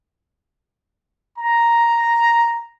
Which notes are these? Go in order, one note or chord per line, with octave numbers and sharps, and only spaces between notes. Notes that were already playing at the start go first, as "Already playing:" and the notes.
A#5